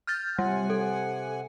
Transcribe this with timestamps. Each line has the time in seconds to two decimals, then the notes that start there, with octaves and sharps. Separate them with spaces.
0.07 F6 G6 A6
0.39 C3 G3 F#5 G#5
0.70 A4